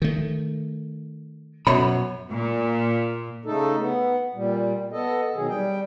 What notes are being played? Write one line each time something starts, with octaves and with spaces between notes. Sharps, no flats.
D#3 A3
F#2 B2 C#5 B5
A#2
C#3 A3 D#4 A4
B3
A#2 G3
B3 A4 D#5
B2 D#3 F#3 G#4
G3 G5